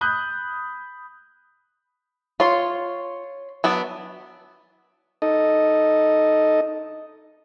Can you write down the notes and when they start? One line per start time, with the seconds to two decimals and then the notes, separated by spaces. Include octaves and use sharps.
0.01 B5 D#6 F#6 G6
2.40 F4 C#5 C6
3.64 F#3 B3 D4
5.22 D#4 A4 D#5